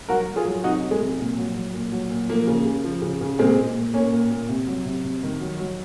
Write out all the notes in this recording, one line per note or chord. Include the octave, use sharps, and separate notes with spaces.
F#3 F#4 A#4
F#3
F4 G#4
F#3
C3 D#4 F#4
F#3
G#3
C3
A#2
F#3
F#3
A#2
F#3
A#2
F3 A#3
C#3
C#3
F3
C#3
C#3
A#2 G#3 C4
A#2
A#2
A#2 A#3 C#4
A#2
A#2
C3
F#3
C3
C3
D#3
F#3
F#3